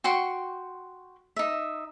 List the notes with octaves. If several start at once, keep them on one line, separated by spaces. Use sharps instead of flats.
F#4 G5 C6 C#6
D#4 E5